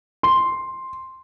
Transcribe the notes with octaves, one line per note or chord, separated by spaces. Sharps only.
C6